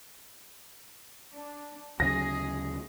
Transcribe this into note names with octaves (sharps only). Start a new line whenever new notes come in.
D4
D2 C#3 F#3 G#4 A#6